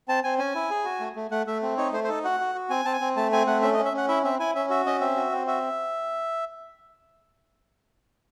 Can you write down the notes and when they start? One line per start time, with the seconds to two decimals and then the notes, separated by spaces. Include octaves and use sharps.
0.09 C4 A5
0.24 C4 G#5
0.38 C#4 G#5
0.55 E4
0.70 G#4
0.85 F#4
1.00 A3
1.16 A3
1.31 A3 F#5
1.47 A3 E5
1.62 C4
1.77 D#4 C#5
1.93 A3 C5
2.04 C5
2.08 D#4 A4
2.24 F#4 F#5
2.40 F#4
2.55 F#4
2.70 C4 G#5
2.85 C4 A5
2.93 G#5
3.01 C4
3.16 A3 A5
3.32 C4 G#5
3.47 A3 F#5
3.62 C#4 E5
3.73 D#5
3.78 C#4
3.85 E5
3.93 C#4 F#5
4.08 E4 E5
4.23 C4 E5
4.39 E4 G#5
4.55 C#4 E5
4.70 F#4 E5
4.86 C#4 D#5
5.01 C4 E5
5.16 F#4
5.32 C4
5.47 F#4 E5